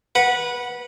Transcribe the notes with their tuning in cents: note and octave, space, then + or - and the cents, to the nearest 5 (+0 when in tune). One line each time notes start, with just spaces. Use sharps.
B4 -20 F#5 +0